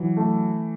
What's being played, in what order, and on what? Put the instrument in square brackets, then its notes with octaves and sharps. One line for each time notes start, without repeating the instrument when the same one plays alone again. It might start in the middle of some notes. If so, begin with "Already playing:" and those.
Already playing: [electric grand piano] E3 [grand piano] F#3
[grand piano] A3